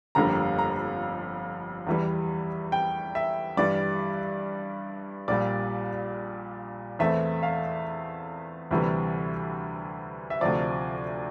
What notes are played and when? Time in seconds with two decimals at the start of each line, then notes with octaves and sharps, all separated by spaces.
0.15 G1 F2 D3 G3 A#3 A#5
0.59 A#5
1.87 E2 E3 G3
2.72 G5
3.15 E5
3.57 G2 E3 G3 D5
5.28 A#1 A#2 G3 D5
6.99 E2 E3 A3 C4 E5
7.43 F5
8.71 D2 C3 E3 G3
10.30 E5
10.41 D2 C3 F3 D5